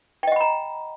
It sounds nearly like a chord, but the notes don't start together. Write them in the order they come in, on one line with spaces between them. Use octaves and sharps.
G5 D#5 F#5 B5 A#5